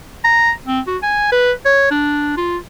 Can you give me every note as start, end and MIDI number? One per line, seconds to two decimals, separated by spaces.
0.24 0.51 82
0.67 0.80 60
0.88 0.97 66
1.03 1.29 80
1.32 1.52 71
1.66 1.87 73
1.91 2.37 62
2.37 2.57 65